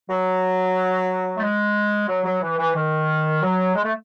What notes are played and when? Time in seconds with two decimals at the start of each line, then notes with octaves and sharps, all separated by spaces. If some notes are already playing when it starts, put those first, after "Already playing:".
0.08 F#3
1.37 A3
1.41 G#3
2.08 F#3
2.25 F#3
2.42 E3
2.58 E3
2.75 D#3
3.42 F#3
3.75 G#3
3.83 A3